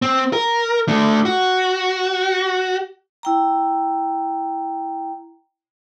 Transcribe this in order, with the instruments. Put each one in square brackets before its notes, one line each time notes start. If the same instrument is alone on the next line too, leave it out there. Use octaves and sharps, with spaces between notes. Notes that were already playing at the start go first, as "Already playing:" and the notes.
[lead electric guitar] C4
A#4
A3 D4
F#4
[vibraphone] E4 G5 A#5